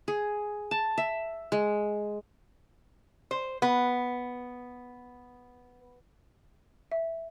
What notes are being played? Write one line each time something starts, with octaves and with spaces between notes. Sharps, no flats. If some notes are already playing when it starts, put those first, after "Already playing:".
G#4
A5
E5
G#3
C5
B3
E5